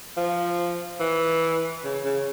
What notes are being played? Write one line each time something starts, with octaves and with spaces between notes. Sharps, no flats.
F3
E3
C#3
C#3